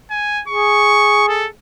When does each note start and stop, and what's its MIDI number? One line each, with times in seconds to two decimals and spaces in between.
0.11 0.42 80
0.48 1.50 68
0.48 1.27 85
1.28 1.47 69